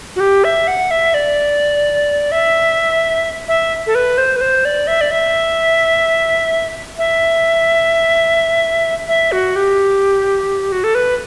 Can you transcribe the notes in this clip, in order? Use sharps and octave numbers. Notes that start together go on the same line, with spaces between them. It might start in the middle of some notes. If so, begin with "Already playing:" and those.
F#4
G4
E5
F#5
E5
D5
E5
E5
A4
B4
C5
B4
C5
D5
E5
D5
E5
E5
E5
F#4
G4
F#4
A4
B4